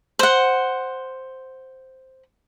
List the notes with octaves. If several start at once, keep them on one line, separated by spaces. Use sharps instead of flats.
C5 F#5